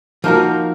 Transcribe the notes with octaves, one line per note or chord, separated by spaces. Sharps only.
F3 A#3 D#4 F#4 A#4